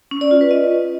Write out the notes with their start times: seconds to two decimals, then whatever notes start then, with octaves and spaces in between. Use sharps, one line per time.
0.11 C#4
0.21 D5
0.31 F4
0.41 B4
0.51 D#5